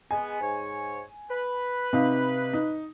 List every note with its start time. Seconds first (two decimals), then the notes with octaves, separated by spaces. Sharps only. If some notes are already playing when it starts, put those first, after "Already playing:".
0.11 G#3 B3 G#5
0.41 G#2 C#5
1.30 B4
1.93 C3 D#4 F5
2.53 D#4